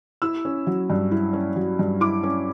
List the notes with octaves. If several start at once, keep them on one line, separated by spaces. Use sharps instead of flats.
E4 E6
C#4
F#3
G2
E4
C#4
F#3
G2
E4 D6
C#4